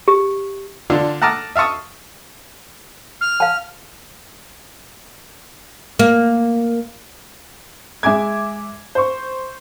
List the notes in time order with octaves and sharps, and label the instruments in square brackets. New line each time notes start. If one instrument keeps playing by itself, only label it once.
[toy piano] G4
[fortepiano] D3 D4 F4
F#5 A5 A#5 D6 D#6 F6
E5 F5 A5 C#6 D#6
[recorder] F6
[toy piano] F5 A5
[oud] A#3
[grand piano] G#3 E5 G#5 D6 G#6
C5 C#6